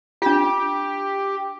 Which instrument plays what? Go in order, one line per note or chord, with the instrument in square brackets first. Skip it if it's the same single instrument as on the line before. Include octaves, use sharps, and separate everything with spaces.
[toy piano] D4 F4 [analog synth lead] G4